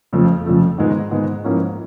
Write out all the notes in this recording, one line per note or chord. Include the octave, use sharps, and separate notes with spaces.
F2 C#3 F3 A3
F2 C#3 F3 A3
G#2 D#3 G#3 B3 D#4
G#2 D#3 G#3 B3 D#4
G#2 F3 A#3 C#4 E4